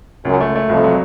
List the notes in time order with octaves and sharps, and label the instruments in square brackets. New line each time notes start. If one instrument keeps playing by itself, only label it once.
[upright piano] C#2 [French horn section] F#2
[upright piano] A3
A3
[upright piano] C2 [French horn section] F2
[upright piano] F#3